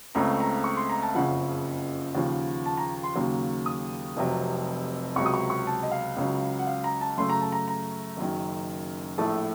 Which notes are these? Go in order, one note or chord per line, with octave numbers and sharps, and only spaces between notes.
C#2 C#3 A3 C4 A#5
A#5
C#6
C6
A#5
A5
F#1 F2 C#3 F3 F#5
D#2 C#3 F3
A5
A#5
C6
D#2 C#3 F#3 A#3
D#6
F1 F2 C3 F#3
C#2 C3 F#3 C#6
D#6
C#6
C#6
A5
D#5
F5
C#2 C#3 F#3
F#5
F5
A#5
A5
F#2 C#3 A3 C6
A#5
A5
A#5
A#5
F#1 F#2 D#3
A#1 A2 A3 A5